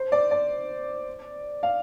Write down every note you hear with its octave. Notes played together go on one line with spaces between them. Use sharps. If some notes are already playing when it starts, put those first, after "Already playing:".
Already playing: C5
D5
D5
F5